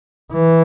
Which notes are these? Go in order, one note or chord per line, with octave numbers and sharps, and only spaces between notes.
E3